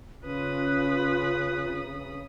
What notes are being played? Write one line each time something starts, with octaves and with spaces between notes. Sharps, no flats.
C#3 C#4 F4 B4 D#6 F#6